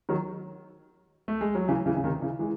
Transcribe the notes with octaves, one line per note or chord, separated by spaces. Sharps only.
D#3 F#3
A3
G#3
F#3
C#3 E3
C#3 E3
C#3
C3 D#3
C#3 E3
E3 G#3